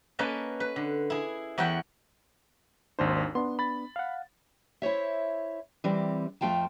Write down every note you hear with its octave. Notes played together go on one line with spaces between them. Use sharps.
A#3 C#4 B4 D#5 A5
B4
D3
E4 G#4
E2 E4 C#5 F#5 G5 B5
G#1 D#2 D4 C5
B3 D4 C6
B5 A6
F5 F#5
E4 C5 C#5 E5
E3 G3 C4 D5
F2 A3 F4 G5 A5